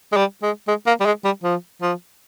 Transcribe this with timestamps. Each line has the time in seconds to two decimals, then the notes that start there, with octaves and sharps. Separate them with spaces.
0.12 G#3
0.17 G3
0.43 G#3
0.68 G#3
0.87 A#3
1.00 G3
1.06 G#3
1.25 G3
1.44 F3
1.82 F3